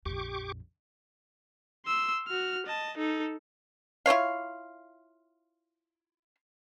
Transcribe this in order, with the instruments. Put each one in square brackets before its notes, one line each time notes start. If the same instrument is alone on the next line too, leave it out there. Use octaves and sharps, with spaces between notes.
[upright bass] A#1 F2 [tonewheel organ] G4 C#6 D6
[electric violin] C6 E6
F#4 F6
D#5 A5
D#4 A4
[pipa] E4 F4 C#5 F5